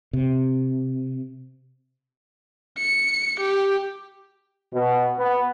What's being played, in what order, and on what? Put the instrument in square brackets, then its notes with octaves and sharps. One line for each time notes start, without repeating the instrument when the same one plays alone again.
[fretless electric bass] C3
[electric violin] C#7
G4
[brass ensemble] B2
B3